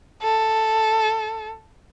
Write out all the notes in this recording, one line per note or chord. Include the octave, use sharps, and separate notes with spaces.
A4